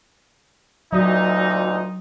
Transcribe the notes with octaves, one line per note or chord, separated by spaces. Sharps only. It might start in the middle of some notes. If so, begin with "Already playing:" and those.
D2 A#2 F#3 D#4 F#4 D5 E5